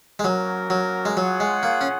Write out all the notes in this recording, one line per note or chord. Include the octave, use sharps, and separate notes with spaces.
G#3
F#3 A#3 C#4 F#4 A#4
F#3
G#3
F#3 F4 G#4 C#5 F#5
G#3
A#3
C#4